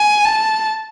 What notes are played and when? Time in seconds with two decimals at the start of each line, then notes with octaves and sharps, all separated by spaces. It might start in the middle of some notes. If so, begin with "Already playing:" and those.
Already playing: G#5
0.26 A5